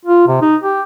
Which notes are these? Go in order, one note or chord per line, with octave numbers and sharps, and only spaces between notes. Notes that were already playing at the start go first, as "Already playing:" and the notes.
F4
C3
D#4
G4